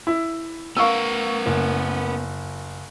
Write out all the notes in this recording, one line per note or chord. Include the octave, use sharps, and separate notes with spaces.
E4
B3 A#4 F5 C#6 E6
F#1